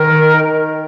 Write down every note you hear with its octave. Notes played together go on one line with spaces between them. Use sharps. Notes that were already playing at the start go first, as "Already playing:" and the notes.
Already playing: D#3 A#4
D#3